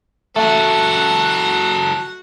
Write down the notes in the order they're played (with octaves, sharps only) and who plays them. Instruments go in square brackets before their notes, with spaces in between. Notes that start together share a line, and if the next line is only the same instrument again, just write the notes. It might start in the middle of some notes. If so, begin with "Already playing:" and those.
[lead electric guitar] F#3 A4 [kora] A3 [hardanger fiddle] F#4 F#5